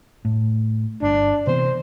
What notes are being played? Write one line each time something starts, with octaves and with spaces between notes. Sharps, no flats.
A2
G1 D4
C3 E3 B3 C5